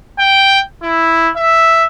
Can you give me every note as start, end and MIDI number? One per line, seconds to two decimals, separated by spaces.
0.19 0.61 79
0.83 1.30 64
1.36 1.86 76